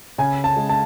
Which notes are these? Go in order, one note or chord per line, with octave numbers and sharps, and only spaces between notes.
C#3 G#5
A5
G#3
A5